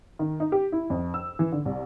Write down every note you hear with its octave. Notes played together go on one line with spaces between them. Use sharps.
D#3
D#4
G4
E4
F2
E6
E3
D3
C2